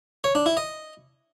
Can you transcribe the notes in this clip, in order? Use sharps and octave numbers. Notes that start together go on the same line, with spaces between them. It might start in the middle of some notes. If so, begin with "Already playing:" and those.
C#5
D4
E4
D#5